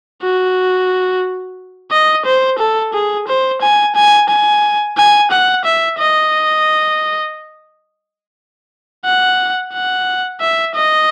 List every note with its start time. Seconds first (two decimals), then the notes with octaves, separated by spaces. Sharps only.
0.22 F#4
1.91 D#5
2.26 C5
2.59 A4
2.93 G#4
3.28 C5
3.62 G#5
3.96 G#5
4.29 G#5
4.97 G#5
5.31 F#5
5.65 E5
5.99 D#5
9.05 F#5
9.73 F#5
10.41 E5
10.75 D#5